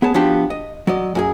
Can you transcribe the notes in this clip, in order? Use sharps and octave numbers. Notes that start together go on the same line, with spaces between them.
B3 G#4 C#5 A5
F3 B3 D4 F#4 G4
D#5
F#3 D5 D#5
F#2 F#4 G#4